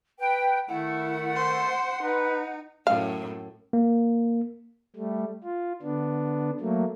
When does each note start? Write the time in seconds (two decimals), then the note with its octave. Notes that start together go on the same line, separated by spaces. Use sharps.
0.19 B4 G5
0.69 D#3 A3 E4 F#5
1.36 C5 C6
2.03 D#4 B4
2.87 F#2 A2 F5
3.73 A#3
4.96 G3 A3
5.44 F4
5.82 D3 B3 D4
6.60 F#3 A3 A#3